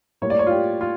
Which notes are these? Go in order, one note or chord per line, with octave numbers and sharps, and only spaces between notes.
A2 G3 A#3 C#5
D5
C#5
F4
G4
F4